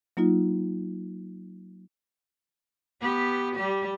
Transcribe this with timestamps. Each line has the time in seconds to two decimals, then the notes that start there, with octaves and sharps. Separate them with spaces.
0.17 F#3 A#3 D#4 F4
3.01 B3 G4
3.55 G3 G4